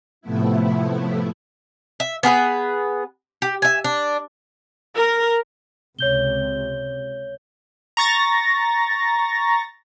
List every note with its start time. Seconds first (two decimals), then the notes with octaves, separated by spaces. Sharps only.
0.21 A2 C3 F3 A3 B3 E4
2.00 E5
2.23 B3 G#4 A#4 B4
3.42 G4
3.62 E5 G#5
3.84 D4
4.96 A#4
5.99 C#2 C3 C#5 G6 G7
7.97 A#5 C#6 A6 A#6